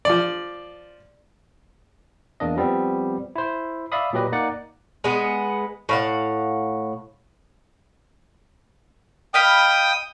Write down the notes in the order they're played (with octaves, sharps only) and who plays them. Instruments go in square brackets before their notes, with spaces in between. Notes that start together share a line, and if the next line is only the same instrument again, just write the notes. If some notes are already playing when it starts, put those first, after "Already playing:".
[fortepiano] F3 D5
[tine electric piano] E2 A#3 D4 D#5
F3 G3 B3 C4
E4 C5
D5 E5 F5 B5 D#6
A#2 F#3 G4 B4 D#5
A#3 D#4 D5 F#5
[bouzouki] G#3 B3
A2 F5 F#5
[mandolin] D#5 F5 B5 [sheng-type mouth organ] G5 D#6